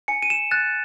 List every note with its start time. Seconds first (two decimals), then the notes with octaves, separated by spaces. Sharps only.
0.08 G#5 C#7
0.22 D#7
0.30 E7
0.51 F#6 A6